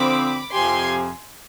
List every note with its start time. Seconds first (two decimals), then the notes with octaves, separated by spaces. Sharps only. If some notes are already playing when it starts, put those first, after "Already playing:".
Already playing: D3 F3 C4 B5 D6
0.53 F2 C3 F3 C4 G4 G#5 C6